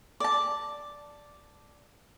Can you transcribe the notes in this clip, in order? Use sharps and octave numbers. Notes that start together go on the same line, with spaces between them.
D5 A5